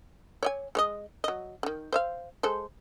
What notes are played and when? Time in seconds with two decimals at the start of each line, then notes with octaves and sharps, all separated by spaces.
0.43 C#5 D#5 G#5
0.75 G#3 C#5 D#5
1.24 F#3 D#5
1.63 D3 D#3
1.93 C5 E5 F5
2.43 G#3 A4 C5